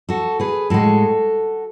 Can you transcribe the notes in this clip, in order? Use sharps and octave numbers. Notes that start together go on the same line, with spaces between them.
F#4 A4
G#4 B4
A2 G#3 F#4 A4